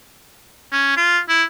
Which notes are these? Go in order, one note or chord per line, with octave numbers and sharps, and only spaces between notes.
C#4
F4
E4